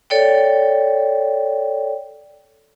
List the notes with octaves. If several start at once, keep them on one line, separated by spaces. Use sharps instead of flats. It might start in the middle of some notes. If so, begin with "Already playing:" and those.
A4 C#5 D5 G5